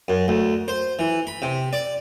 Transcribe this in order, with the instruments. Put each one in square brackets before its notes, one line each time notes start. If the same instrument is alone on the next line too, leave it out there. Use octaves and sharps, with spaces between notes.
[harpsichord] F#2
D2
C5
E3
B5
C3
D5